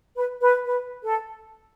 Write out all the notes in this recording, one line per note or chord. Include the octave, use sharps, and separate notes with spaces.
B4
B4
B4
A4